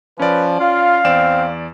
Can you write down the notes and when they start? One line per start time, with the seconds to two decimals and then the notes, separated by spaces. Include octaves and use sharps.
0.19 F3 C#4 B4 D5
0.60 F4 F5
1.04 E2 C4 D5 E7